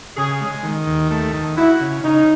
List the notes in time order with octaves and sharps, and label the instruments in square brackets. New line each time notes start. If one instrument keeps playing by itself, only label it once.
[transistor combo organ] C#3 [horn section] G#4
[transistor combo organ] G#3
D#3
D#2
A3
D#3
[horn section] E4 [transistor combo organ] F#4
[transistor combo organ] C#3
[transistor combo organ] C#3 [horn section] D#4